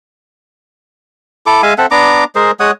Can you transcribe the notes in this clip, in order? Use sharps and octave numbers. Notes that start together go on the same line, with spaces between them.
E4 A4 D6
G#3 E5 F5 G#5
C4 A4 E5 F#5
B3 D4 A#5 D6
G#3 G#4 A#4 C5
G#3 C#5 F#5 D#6